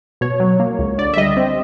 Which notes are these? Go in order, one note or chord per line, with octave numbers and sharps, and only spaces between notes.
B2 C#5
F#3
A#3
C#2
D3 D5
E5
G3 D#5
C4